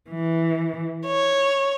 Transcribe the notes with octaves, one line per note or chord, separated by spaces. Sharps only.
E3
C#5